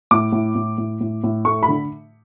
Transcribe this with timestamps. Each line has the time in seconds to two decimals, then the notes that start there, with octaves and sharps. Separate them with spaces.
0.11 A2 D6
0.32 A2
0.55 A2
0.78 A2
1.01 A2
1.24 A2
1.45 A3 C#6
1.63 B5
1.68 D3